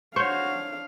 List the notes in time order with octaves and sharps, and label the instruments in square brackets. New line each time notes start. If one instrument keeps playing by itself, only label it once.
[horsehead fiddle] D4 F5 [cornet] F#4 [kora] C5 C#5 [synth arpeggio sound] C#6 G6